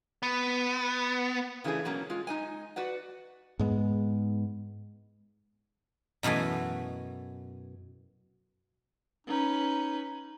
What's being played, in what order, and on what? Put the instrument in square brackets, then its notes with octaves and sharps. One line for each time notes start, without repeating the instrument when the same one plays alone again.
[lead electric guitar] B3
[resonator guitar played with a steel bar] C#3 E3 A3 D4 G#4
B2 F#3 A#3 C#4
G#3 F4
G#3 D#4 D#5 G#5
F#4 B4 D5 F#5
[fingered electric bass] G#2 G#3 B3
[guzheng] F#2 B2 E3 A3 G#5
[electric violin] C#4 B4 [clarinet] D#4